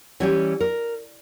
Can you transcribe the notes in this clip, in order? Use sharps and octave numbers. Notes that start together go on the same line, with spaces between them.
E3 G3 C#4 G4
A#4